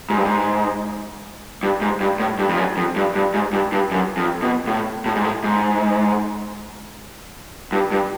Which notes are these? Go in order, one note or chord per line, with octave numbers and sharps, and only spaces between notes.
G#2
G2
G#2
G2
G#2
G2
A2
G2
F2
F#2
F2
G2
G2
G#2
G2
G2
F#2
F2
B2
A2
A2
G#2
A2
G#2
G2
G2